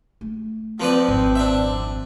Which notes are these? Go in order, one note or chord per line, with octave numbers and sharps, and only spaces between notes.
A3
F3 C4 B4 D5
G#1 F2
D4 E5